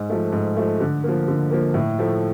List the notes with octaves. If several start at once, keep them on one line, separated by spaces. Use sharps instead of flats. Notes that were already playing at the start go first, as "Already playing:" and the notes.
Already playing: G#2
F3 A3
G#2
F3 A3
D3
F3 A#3
D3
F3 A#3
A2
F3 A3